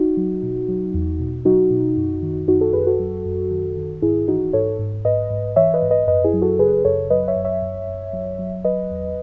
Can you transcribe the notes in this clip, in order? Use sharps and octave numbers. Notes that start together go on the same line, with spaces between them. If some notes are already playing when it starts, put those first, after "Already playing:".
Already playing: D#4 F#4
F#3
B2
F#3
E2
B2
F#3 D#4 F#4
B2
F#2
D#3
F#2 D#4 F#4
F#4 A4
F#2 G#4 B4
F#4 A4
F#3
F#2
D#3
D#3
G#2 E4 G#4
E3 D#4 F#4
G#2 A4 C#5
G#2
G#2 B4 D#5
G#2
E3 C#5 E5
B4 D#5
G#2
B4 D#5
F#2 B4 D#5
E4 G#4
F#3
F#4 A4
C#3 G#4 B4
F#2 A4 C#5
F#3 B4 D#5
C#5 E5
F#2
C#5 E5
F#2
F#2
F#3
F#3
F#3 B4 D#5
E2